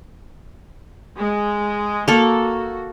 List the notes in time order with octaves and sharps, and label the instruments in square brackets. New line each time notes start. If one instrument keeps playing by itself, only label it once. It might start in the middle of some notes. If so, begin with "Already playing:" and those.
[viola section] G#3
[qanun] A#3 A4 [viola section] F#4